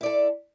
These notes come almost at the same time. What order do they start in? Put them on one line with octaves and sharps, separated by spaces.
E4 D5 A4